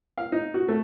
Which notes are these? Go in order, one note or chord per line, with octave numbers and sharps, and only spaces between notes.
F5
D#4
F#4
A3